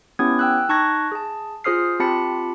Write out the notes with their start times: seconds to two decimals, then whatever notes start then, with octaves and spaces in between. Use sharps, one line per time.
0.19 B3 C#4 E4 G4 D#6 G#6
0.39 G5 E6 F#6
0.69 D#4 A5 C#6 F#6 G#6 A#6
1.12 G#4 A5
1.64 F4 G#4 C5 D#6 F6 C7
2.00 C4 F4 G4 A5 B5 C#7